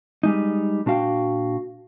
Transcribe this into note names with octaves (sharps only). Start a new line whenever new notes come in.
G3 G#3 D#4
A#2 D4 F#4 F5 G5